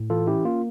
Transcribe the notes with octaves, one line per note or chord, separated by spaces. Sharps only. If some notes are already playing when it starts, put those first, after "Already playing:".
Already playing: A2
E3 F4 A4
C#4 E4 G4
A#3 F4